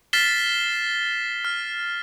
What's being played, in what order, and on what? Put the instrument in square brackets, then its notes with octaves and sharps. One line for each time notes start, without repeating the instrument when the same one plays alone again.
[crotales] F6 A6 B6 C7 E7 G7
F6